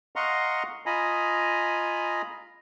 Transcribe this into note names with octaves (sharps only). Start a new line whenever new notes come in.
D#5 F5 F#5 A#5 C6 C#6
F4 D#5 G#5 A#5 B5